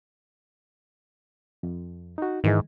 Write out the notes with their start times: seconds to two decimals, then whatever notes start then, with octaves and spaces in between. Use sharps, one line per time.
1.63 F2
2.18 D#4 F#4
2.44 G#2 D#3 E3 G#3